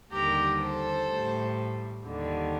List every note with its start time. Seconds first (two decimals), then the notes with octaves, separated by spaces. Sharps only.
0.11 D#2 D3 G3 G4 A#4
0.59 A4 C5
1.07 A2 G3
2.04 D#2 D3 G3